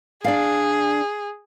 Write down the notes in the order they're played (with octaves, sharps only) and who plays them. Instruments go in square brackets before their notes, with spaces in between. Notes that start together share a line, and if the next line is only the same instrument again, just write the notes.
[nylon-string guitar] D4 D5 F5 [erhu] G#4